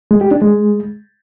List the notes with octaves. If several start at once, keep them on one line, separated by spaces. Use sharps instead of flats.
G#3
G4
D4
G#3